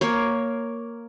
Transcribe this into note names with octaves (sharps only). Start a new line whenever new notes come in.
A#3 C#5